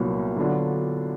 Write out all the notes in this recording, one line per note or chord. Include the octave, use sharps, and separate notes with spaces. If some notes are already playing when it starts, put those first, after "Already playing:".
Already playing: C2 A#2 F#3 B3
D3 F#3 B3 D4 F4